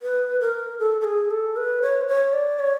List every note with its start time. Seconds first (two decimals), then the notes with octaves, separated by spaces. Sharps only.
0.02 B4
0.41 A#4
0.79 A4
1.01 A4
1.04 G#4
1.31 A4
1.57 B4
1.82 C#5
2.01 C5
2.07 C#5
2.33 D5
2.59 C#5